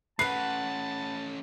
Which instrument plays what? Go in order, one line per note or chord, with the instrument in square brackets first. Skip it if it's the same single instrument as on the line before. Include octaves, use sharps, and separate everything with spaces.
[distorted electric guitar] A3 C#4 [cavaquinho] B4 F#5 [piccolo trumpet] A5 [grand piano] C7